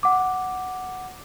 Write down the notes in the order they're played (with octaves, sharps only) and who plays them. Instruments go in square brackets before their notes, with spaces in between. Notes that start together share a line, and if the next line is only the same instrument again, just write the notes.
[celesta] F#5 D6